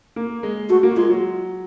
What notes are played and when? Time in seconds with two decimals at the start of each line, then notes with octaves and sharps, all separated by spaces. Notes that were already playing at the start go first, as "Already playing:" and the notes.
0.16 A#3
0.43 G#3
0.69 A3 F#4
0.83 A#3
0.96 G#3 F4
1.09 F#3